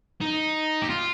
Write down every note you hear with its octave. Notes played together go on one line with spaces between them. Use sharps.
D#4
G4
F4